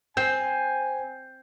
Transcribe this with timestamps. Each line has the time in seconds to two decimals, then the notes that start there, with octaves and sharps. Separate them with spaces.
0.17 C4 G#5 G6 C7